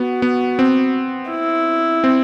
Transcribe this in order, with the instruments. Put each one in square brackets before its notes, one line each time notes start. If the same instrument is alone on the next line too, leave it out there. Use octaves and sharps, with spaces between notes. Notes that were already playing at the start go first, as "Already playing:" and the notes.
Already playing: [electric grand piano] B3 [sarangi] F#4
[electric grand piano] B3
C4
[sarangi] E4
[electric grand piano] C4